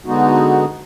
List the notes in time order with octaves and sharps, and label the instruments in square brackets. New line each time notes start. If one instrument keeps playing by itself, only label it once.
[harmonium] D3 G#3 B3 D#4 F#4